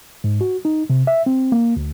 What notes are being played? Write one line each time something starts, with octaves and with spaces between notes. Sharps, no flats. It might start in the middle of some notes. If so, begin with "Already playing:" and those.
G#2
F#4
D#4
C3
E5
C4
A#3
D2